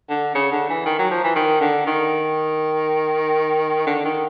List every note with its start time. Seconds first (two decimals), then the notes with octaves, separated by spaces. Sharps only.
0.10 D3
0.35 C#3
0.52 D3
0.70 E3
0.86 D#3
0.99 F#3
1.11 F3
1.24 E3
1.36 D#3
1.61 D3
1.87 D#3
3.87 D3
4.05 D#3